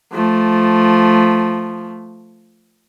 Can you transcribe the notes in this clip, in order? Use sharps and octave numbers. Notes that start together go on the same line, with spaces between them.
F3 A3